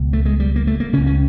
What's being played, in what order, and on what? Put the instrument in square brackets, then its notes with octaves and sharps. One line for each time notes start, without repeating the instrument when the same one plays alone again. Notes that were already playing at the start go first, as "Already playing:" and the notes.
Already playing: [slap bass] C#2 B2
A3
G#3
G3
A#3
A3
A#3
C#3 C#4
C#2
C#4